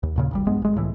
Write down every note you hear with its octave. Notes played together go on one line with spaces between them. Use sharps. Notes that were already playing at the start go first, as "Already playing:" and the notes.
D#2
D#2 A#2 C#3
D#1 G#1 G3
A#1 G2 G#3 B3
G#1 G#3
C#2 A2 E3